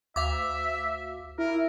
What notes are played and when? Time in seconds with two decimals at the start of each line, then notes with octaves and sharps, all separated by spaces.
0.16 D2 E5 F5 D6
1.38 E4 A#4